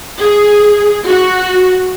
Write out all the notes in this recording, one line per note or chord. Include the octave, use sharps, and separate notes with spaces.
G#4
F#4